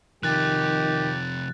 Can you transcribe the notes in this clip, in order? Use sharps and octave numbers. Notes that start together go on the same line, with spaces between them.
C3 D#3 F3 G4 F#6 A6